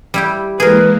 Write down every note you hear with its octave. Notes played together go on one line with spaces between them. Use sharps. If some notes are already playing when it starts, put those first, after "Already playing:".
G3 E4 G4
E3 G#3 A#3 G#4 A#4 B4